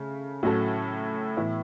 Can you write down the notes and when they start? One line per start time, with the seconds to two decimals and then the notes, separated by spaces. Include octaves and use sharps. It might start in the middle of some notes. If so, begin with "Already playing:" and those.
Already playing: C#3 A3
0.43 A2 F#3 C#4 F#4 A4
1.37 A2 E3 B3 E4